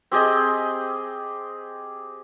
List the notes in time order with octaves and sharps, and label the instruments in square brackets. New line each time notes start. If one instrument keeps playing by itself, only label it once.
[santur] C4 G4 G#4 D#5